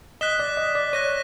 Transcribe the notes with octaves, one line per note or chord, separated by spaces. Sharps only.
D#5 F#6 B6 E7 G7
D5
D#5
D5
C#5 F#6 A#6 D#7